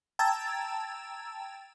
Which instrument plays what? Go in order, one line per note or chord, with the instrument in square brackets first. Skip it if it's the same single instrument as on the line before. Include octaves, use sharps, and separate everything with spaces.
[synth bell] G5 A5 A#5 E6 G#6 A6